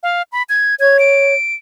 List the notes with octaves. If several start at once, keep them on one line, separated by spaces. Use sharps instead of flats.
F5
B5
G#6
C#5 G#6
D7